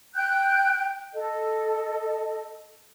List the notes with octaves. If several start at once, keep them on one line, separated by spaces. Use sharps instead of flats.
G5 F#6 G6
A4 D#5